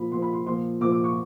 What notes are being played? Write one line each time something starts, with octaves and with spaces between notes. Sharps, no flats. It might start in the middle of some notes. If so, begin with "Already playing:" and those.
Already playing: A#2 F3 B5
A#2 F3 C6
B5
C6
A#2 F3 C6
A#2 F3 D6
D6
C#6